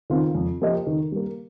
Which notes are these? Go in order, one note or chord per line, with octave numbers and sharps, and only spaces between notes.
D#3 C4 F4
F2
F3 A#3 G4 D#5
D#3
G3 A#3